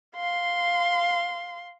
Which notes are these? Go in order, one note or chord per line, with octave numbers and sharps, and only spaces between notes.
F5 C6